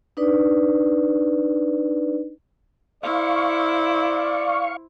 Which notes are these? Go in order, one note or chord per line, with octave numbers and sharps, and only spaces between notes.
D4 D#4 B4 D5
E4 C5 D5 F5 C#6